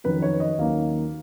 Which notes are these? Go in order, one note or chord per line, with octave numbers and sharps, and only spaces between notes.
F2 D#3 F#3 C#4 B4
C#5
D#5
D#2 D#3 F#3 A#3 C#4 F5